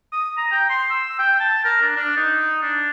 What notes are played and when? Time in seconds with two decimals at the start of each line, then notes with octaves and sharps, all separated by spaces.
0.12 D#6
0.37 A#5
0.52 G5
0.70 C6
0.90 E6
1.19 G5
1.40 A5
1.64 A#4
1.81 D4
1.96 D4
2.17 D#4
2.62 D4